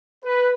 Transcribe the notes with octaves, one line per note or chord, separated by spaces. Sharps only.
B4